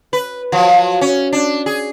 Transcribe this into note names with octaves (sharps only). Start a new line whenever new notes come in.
B4
F3 F#3
C#4
D4
G#4